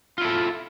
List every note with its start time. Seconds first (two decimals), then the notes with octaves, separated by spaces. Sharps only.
0.18 F4
0.21 E4
0.25 A4